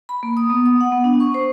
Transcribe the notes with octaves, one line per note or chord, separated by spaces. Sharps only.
B5
A#3
D#6
B3
D#6
F#5
B3
D4
C#6
C5